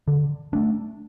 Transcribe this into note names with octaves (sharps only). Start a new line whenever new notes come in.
D3
A3 D4